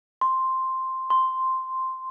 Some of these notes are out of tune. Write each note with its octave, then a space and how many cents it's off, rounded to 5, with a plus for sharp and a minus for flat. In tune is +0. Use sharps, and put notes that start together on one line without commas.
C6 +0
C6 -5